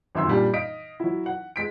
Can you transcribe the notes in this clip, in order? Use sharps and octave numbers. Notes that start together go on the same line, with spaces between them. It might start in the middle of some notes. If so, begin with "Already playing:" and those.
G#1 F#2 E5 C6 E6
A#2 G3 D4
D#5 F5 B6 D7
F#3 E4
F#5
G#3 B6 D7